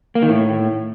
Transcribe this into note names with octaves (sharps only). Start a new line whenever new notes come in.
A#3
D#3
A2